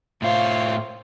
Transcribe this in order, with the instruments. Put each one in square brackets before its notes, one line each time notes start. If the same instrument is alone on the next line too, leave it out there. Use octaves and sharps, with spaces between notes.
[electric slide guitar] A2 F4 [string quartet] C5 C#5 F5